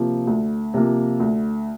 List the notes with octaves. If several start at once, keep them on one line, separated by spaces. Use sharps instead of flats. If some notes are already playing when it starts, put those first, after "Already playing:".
Already playing: C3 F3 A#3
D2
C3 F3 A#3
D2